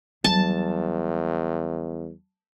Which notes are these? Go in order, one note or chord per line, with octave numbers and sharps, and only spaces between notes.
E2 F#3 G3 A5